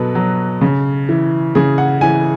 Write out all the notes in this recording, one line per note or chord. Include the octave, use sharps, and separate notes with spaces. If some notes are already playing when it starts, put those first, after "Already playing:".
Already playing: B2 F#3 A4 B4
F#3
C#3
E3
C#3 G#4
F#5
E3 G#5